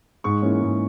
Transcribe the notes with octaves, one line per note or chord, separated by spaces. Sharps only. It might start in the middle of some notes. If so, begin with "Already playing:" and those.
G#2 C#6
E3 A#3 C#4
G#2